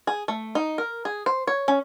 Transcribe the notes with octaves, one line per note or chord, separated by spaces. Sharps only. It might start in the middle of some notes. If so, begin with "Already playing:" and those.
G#4
A3
D#4
A#4
G#4
C5
C#5
C#4